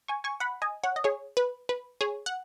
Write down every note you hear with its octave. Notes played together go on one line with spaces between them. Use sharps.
G#5 C#6
G#5 C#6
F#5 B5
D#5 G#5
C#5 F#5
D#5
G#4 C#5
B4
B4
G#4 C#5
F#5